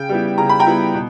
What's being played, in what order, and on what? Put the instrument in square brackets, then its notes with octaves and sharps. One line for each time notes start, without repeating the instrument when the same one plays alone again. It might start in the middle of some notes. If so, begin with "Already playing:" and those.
Already playing: [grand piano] C#3 G5
G3 B3 E4
C#3 A#5
B5
G5 A#5
G3 B3 E4
B2